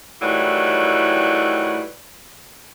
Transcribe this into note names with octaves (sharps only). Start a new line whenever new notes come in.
A2 D#3 E3 F#3 G3